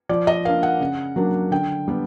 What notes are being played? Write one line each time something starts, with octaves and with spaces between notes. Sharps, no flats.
F3 D5
D#5
A#3 D4 F5
F#5
C#3
F#3 A#3 D4
D3 G5
G3 B3 D4